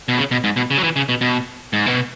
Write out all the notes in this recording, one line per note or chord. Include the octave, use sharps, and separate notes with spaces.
B2
C#3
B2
G#2
B2
C#3
F#3
E3
C#3
B2
B2
G#2
B2